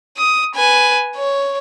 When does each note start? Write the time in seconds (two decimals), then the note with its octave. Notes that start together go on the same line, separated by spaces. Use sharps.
0.18 D#6
0.55 B4 G#5
1.16 C#5